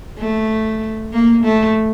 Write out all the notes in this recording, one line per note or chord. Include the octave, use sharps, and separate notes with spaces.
A3
A#3
A3